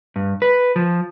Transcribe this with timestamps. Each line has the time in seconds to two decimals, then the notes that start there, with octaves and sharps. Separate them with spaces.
0.16 G2
0.42 B4
0.76 F3